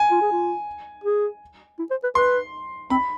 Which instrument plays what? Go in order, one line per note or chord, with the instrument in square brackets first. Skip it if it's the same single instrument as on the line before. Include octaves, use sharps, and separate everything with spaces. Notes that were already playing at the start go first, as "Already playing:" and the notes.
Already playing: [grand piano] G#5
[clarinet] F4
G#4
F4
G#4
E4
C5
B4
[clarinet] B4 [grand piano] C6
[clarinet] C4 [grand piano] B5